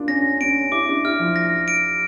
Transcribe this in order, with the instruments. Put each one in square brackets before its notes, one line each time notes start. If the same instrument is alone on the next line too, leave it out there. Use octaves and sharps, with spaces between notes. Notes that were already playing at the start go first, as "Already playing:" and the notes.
Already playing: [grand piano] A#3 D4 F4
[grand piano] C#4 [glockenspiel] A#6
[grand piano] C#4 [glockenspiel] D7
[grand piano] E4 [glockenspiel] D6
[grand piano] D4
[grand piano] E4 [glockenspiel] F6
[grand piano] F3
[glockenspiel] A#6
D7